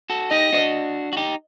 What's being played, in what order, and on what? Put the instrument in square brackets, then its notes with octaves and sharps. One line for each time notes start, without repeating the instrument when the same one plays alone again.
[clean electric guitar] F#4 A4
[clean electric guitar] D#4 G4 [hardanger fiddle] D#5
[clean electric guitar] D4 F#4
F#4
D#4 G4